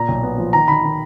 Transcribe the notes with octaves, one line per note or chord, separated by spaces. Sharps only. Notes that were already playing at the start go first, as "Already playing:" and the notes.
Already playing: A#2 A#5
B1
B3
F3
D#3 A#5
D#3 B5
D#3